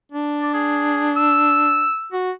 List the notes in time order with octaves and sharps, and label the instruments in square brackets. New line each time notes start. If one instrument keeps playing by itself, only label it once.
[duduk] D4
[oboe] D5
G#4
E6
[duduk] F#4